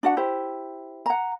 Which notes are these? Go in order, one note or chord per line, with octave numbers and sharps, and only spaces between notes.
D4 F#4 F#5
E4 G4 C5
F#5 A#5